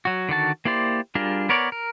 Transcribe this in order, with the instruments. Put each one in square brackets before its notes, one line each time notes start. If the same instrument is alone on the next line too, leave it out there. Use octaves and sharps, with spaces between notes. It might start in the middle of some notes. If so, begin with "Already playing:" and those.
[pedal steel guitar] F#3 F#4
D3 D#3 F#4 A5
A#3 E4 G4 C5 D5
G3 D4 F4 G#4 A#4
B3 A#4 C#5 D5
A#4